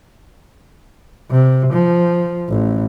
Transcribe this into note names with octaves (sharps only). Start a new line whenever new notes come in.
C3
F3
A1